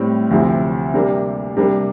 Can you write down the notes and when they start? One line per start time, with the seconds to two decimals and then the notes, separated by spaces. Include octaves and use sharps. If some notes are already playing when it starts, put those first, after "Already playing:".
Already playing: A2 G3 C4
0.31 D2 C3 F3 C4 E4
0.94 C3 G3 A#3 D4
1.57 C3 G3 A#3 D4